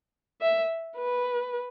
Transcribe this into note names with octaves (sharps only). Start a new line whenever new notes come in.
E5
B4